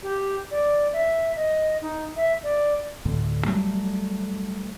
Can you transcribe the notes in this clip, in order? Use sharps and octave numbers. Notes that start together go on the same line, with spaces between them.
G4
D5
E5
D#5
D#4
E5
D5
D2 A2 D3
F#3 G3 A3